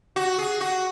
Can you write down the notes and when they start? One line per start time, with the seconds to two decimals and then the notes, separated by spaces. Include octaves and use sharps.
0.16 F#4
0.39 G#4
0.61 F#4